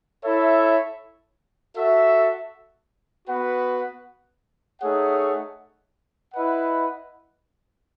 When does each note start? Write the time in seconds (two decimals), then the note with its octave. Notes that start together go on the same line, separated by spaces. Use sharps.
0.23 E4 A4 C#5 E5
1.75 F#4 A4 E5
3.28 B3 F#4 B4 F#5
4.80 A3 D#4 G#4 C#5 F#5
6.33 E4 B4 D#5 F#5